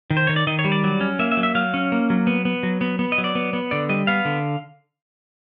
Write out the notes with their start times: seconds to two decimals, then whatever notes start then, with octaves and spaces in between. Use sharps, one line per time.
0.10 D#3
0.17 C5
0.27 D#3 C#5
0.36 D5
0.47 D#3 D#5
0.59 C#5
0.65 G3
0.72 D5
0.84 F#3
1.01 C#4
1.19 A#3 E5
1.32 E5
1.37 F#3
1.43 E5
1.55 F#3 F5
1.74 C#4
1.92 A#3
2.10 F#3
2.27 B3
2.45 B3
2.63 F#3
2.81 B3
2.99 B3
3.12 D#5
3.18 F#3
3.24 D5
3.35 B3
3.53 B3
3.71 D3 D5
3.89 G3 D#5
4.07 B3 F5
4.25 D3